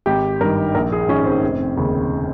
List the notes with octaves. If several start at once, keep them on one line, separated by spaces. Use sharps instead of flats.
G#1 G4
G2 D#3 A#4
A#1 A#4
G#4
G#2 D#3 C#4
C4
F1
D#2 C#3